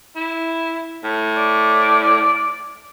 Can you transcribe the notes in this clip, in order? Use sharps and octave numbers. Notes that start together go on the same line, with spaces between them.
E4
A2
D5